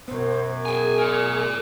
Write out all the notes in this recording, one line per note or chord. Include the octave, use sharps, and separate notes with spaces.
F#2 B2 B3 C5
G#4 G5 G#5
A#4 D5